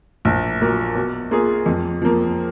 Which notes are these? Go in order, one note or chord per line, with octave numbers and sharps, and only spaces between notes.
A#1
A#2 F#3 A#3
B2
A#3 F4 G#4
F2
F3 A#3